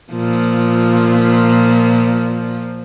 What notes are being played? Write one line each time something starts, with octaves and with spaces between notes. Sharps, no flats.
A#2 F3